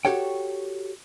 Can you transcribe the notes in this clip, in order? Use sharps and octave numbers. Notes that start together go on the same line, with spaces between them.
F#4 G4 A4 C#5 G5